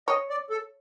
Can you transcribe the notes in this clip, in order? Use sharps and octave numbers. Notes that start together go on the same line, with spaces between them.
C#5 D#5
D5
A4